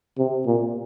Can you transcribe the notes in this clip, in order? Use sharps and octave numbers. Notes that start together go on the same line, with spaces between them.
C3
A#2